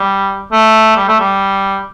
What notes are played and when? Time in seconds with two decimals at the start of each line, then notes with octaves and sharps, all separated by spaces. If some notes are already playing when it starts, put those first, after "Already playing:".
Already playing: G3
0.52 A3
0.96 G3
1.08 A3
1.19 G3